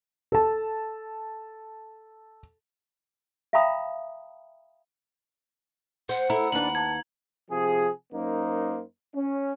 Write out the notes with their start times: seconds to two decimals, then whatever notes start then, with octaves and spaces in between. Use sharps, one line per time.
0.32 A4 A5
3.53 E5 F5 G5 A#5 B5 D#6
6.09 C5 F#5
6.30 E4 A4 A#5
6.52 D#2 D4 B4 F#7
6.75 A5 G#6
7.51 C3 F3 G#4
8.13 F#2 A#3 D#4 C5
9.15 C#4